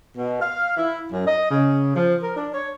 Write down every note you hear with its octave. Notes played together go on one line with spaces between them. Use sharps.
B2
F5
E4
F#2
D#5
C#3
F3
A#4
D4
C#5